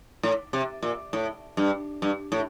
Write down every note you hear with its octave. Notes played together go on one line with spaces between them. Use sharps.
A2
C3
A#2
A2
G2
G2
A2